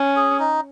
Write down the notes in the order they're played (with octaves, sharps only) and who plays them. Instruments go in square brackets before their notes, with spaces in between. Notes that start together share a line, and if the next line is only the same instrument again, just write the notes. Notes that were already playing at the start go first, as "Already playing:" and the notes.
Already playing: [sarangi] C#4
[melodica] G#4
D#4